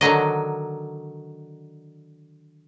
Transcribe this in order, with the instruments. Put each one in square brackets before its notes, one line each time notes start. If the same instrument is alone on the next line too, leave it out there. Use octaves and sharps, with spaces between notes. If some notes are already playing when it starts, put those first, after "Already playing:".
[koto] D3 D#3 F#3 D#5